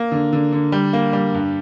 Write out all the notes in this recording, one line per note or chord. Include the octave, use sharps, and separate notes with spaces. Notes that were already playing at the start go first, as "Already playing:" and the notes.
Already playing: A#3
D3
D3
D3
G3
A#3
G3
G2